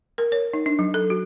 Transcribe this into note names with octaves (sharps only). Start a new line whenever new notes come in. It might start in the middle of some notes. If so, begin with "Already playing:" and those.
A#4
C#5
D#4
D4
F#3
A4
F#4